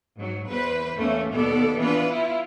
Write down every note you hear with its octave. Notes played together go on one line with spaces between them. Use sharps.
G#2 F#3
E2 B4 C5
E2 A3 A#3 C#4
D#2 B2 B3 A4 D5
E3 B3 D4 F4 B4
E4 F4